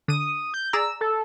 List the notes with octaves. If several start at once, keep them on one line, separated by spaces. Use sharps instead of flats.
D3 D#6 D#7
G6
G#4 D5 A#5 E6
A4